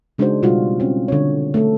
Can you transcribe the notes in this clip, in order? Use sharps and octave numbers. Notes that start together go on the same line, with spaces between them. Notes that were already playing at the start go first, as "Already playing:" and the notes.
C#3 G#3 D4 D#4 F#4 C5
B2 G3 F4 F#4
C4 C#4
D3 C#5
A3 A4